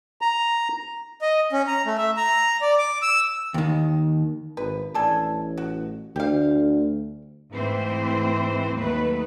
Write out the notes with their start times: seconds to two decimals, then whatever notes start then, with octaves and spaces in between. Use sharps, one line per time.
0.21 A#5
1.22 D#5
1.53 C#4
1.67 A#5
1.86 A3
1.98 E5
2.17 A#5
2.61 D5
2.78 D6
3.02 E6
3.54 D#2 D#3
4.57 G#1 B4
4.95 A1 D4 A4 G#5
5.58 F#4
6.16 D2 G4 F5
7.52 G#2 E3 A3 C4 C5
8.77 D#2 D#3 F#3 A3 B4